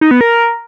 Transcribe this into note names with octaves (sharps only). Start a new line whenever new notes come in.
D#4
B3
A#4